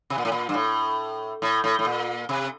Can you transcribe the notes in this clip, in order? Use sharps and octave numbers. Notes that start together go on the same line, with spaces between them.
C3
A#2
A2
A#2
G2
A2
A2
A2
A2
A#2
C3